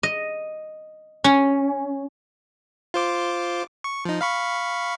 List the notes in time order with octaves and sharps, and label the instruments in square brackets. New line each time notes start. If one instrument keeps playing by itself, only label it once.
[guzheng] D#5
C#4
[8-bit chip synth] F4 C5 D6
C#6
F3 D#4
F5 B5 C#6